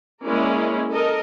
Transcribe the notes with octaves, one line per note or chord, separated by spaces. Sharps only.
G#3 A#3 C#4 E4 A#4 D5
A4 A#4 D#5